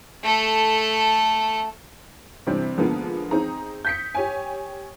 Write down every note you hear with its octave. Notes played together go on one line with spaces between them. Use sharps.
A3 A4
C3 E3 G3 C4 D4
D3 F3 G#3 A#3 B3
C4 D#4 G#4 A#5
G6 B6 C#7
G4 C#5 G#5